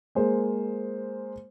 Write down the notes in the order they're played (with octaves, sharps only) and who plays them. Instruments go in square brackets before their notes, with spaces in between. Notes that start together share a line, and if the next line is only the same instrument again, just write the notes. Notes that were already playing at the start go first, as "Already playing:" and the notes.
[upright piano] G#3 A#3 C5